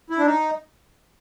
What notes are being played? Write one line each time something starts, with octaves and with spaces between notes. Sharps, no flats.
E4
D4
D#4